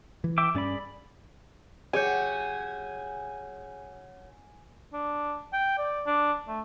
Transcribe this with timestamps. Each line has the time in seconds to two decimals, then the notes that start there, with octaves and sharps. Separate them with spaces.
0.24 E3
0.38 E5 G5 D6
0.55 G2 C#4 G#4 D5 B5
1.93 C#3 F#3 G4 G#4 C#5 G#5 G6
4.93 D4
5.53 G5
5.78 D5
6.07 D4
6.48 A3